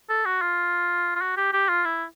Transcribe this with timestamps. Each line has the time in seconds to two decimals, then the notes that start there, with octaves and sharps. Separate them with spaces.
0.09 A4
0.25 F#4
0.41 F4
1.15 F4
1.22 F#4
1.37 G4
1.53 G4
1.69 F4
1.85 E4